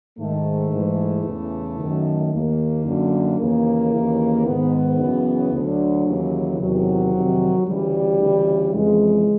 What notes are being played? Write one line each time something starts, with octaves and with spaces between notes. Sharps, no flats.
G#2 D#3 A3
G#2 E3
E2 C#3 E3
F#2 D#3
D#2 D#3 A#3
F#2 D3
D#2 C#3 E3 A#3
D#2 C#3 E3
G#2 D#3 B3
F#2 C#3 E3
D2 F#3
D3
D#2 C#3 E3
E2 C3 D#3 F#3
F2 C3 D#3
D2 C#3 E3 G3
D2 C#3 E3
F2 C#3 E3 G#3